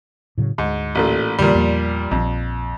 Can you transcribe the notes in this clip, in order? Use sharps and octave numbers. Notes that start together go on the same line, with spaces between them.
A2 C#3 F#3
D2 G#2
A1 A#2 A3
F2 A#2 D3 E3 G3
E2 F3 A#3
A#1 F2